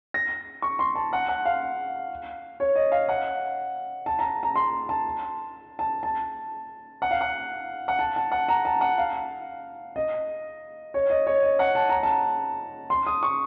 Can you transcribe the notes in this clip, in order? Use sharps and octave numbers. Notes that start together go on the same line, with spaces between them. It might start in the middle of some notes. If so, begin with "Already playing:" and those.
A#6
C#6
C6
A5
F#5
F#5
F5
C#5
D#5
F5
F#5
A5
A#5
A#5
C6
A5
A5
A5
F#5
F5
F#5
F#5
A5
A5
F#5
A#5
A5
F#5
F5
D#5
C#5
D#5
C#5
D#5
F#5
A5
A#5
A5
C6
D#6
C#6